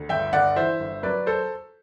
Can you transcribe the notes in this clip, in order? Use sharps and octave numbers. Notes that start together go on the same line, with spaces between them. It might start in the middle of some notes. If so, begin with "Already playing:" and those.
Already playing: D2
G1 E5 G5
G1 D5 F#5
E3 C5 E5
G1
F#3 B4 D5
A4 C5